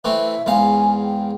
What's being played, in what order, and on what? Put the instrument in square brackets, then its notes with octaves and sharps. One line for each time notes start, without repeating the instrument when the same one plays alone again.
[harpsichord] E3 A3 C4 [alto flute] E5
[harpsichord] E2 G#2 F5 [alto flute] G#5
[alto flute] G5